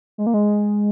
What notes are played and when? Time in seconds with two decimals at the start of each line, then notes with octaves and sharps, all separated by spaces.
0.18 G#3
0.27 A#3
0.34 G#3